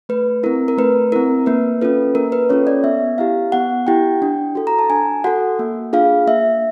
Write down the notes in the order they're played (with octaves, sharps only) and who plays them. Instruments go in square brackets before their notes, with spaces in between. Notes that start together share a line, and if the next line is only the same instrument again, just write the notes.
[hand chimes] A3 B4
C4 E4 A#4
A#4
A3 B4
C4 E4 A#4
A#3 B4
C#4 F4 A4 B4
A#3 A#4
B4
C#4 F4 A4 C#5
D5
B3 E5
E4 G4 F5
B3 F#5
E4 G4 G5
D4
F#4 A4
A#5
A5
D4 G#5
F#4 A4 F#5
A#3
D4 F4 G#4 F5
A#3 E5